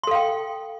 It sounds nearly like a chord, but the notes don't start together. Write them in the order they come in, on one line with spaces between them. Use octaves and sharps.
C6 A4 F5 G5